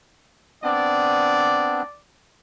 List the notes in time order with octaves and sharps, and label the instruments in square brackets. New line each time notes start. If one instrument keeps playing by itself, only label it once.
[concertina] B3 C4 D4 [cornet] D5